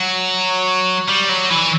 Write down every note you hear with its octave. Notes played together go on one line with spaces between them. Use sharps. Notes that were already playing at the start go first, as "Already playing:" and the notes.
Already playing: F#3
G3
F#3
E3